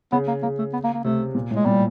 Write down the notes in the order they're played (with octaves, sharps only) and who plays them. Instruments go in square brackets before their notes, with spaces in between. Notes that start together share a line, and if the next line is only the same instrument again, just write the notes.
[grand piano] C#3 [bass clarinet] B3
[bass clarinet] A#3
[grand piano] C#3 [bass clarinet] A#3
[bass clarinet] A3
B3
A#3
A#3
[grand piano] C3 [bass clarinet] A3
[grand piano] A#2
A2
[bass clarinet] G#3
[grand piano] A#2 [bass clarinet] G3